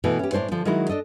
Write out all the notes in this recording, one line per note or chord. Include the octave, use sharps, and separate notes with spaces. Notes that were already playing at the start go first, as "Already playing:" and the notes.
B2 E3 A3
C#4 G4
A2 B3 D4 C5 C#5
D3 F3
D#3 F#3 G#3 E4 F#4
D4 A4 D#5